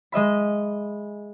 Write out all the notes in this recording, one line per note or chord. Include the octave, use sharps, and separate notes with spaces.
G#3 D#5 E5 B5